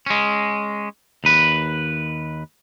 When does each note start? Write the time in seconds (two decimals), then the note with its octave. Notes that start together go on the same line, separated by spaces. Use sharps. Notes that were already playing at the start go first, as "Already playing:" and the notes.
0.06 G#3 C#4
1.24 D#2 B4